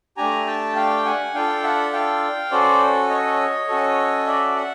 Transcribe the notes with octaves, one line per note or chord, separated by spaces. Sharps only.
A3 D4 G4 G#5 A#5
G5 A5
F5 G5
F#5 G#5
D4 F4 A4 F5 G5
E5 F#5
F5 G5
C#4 F#4 A4 C5 D5
C#5 D#5
C#4 F#4 A4
D5 E5
E5 F#5